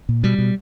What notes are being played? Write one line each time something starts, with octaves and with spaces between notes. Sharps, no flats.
A#2
B2 G3
B2